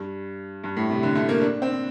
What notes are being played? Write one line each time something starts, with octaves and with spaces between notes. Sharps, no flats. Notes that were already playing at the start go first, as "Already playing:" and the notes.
Already playing: G2
G2
A2
C3
D3
A3
A#3
D4
C4